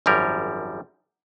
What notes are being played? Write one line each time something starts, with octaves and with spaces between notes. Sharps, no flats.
G#1 F#2 F3 G3 A#4